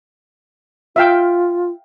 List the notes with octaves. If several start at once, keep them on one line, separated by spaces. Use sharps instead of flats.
F4 E5 F5 G5